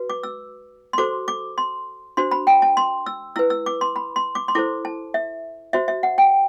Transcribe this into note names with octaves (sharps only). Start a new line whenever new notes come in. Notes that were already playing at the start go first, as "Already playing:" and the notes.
Already playing: F#4 B4
D6
E6
C6
F#4 A4 C5 D6
D6
C6
D4 F#4 C5 C6
B5
G5
A5
C6
E6
E4 B4 E6
E6
D6
C6
B5
C6
D6
C6
E4 A4 C5 D6
A5
E5
F#4 C5 E5
E5
F#5
G5